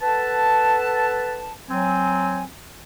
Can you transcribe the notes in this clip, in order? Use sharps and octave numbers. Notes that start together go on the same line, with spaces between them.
A4 B4 F#5 A5
F#3 C4 G#5